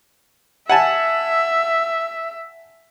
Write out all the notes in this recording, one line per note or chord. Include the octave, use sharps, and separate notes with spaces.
E5 F#5 G#5 A5